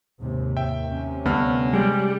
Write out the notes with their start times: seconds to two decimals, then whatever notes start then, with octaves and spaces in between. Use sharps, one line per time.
0.19 D#2 G#2 C3
0.57 D#2 E5 G5
0.86 C3 C#4
1.26 D2 G2 B3 F6
1.73 G3 G#3